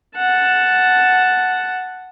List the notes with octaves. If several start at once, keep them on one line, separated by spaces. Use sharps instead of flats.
F#5 A5